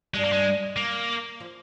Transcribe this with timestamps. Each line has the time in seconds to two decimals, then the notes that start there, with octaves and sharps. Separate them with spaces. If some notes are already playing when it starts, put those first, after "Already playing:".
0.14 G2 G3 G#3
0.24 A#3
0.32 G#3
0.77 A#3
1.40 F3